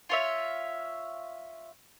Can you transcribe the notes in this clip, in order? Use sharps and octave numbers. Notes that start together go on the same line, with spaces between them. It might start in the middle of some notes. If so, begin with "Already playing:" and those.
F4 C#5 E5